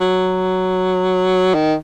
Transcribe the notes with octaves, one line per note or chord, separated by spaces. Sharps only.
F#3
D#3